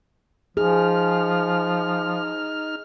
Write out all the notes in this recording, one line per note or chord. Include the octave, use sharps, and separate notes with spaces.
F3 D#4 G#4 F6